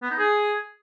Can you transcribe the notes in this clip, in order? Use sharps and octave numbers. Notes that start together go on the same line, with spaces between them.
B3
D#4
G#4